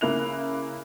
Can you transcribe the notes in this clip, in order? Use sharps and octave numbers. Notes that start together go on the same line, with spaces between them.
C#3 A#3 E4 F#6 F7